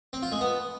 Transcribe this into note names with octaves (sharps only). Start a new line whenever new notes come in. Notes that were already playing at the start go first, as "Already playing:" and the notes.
C4
F4
G#3
B3